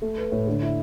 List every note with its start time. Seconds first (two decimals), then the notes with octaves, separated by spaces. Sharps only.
0.02 A3
0.18 B4
0.32 A2
0.47 D3
0.62 E4